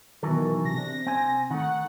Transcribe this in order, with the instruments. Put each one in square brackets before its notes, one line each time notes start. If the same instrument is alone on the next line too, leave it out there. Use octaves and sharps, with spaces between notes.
[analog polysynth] B2 D#3 [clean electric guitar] E3 F#3 A4
[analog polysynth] C3 A#6
[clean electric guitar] D4
C4 G#5
[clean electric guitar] D#3 A3 [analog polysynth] F#5